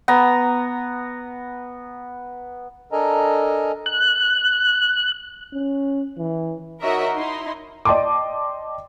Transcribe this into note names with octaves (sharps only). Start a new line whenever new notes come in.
B3 A#5
D4 A4 A#4 D#5 G#5 A#5
F#6
C#4
E3
D#4 F#4 A#4 C#5 D#5 E5
D#4 E4 C6
D5 D#5 G5 A5 C6 D6